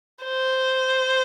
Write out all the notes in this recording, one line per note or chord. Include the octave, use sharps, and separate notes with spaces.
C5